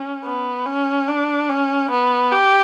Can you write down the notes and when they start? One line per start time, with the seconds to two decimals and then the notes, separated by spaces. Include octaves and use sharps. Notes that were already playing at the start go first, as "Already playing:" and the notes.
Already playing: C#4
0.25 B3
0.66 C#4
1.08 D4
1.49 C#4
1.91 B3
2.32 G4